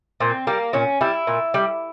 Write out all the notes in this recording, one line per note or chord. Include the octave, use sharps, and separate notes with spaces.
A#2 C4
G3 A#3
A#2 C#4
G3 E4
A#2
G3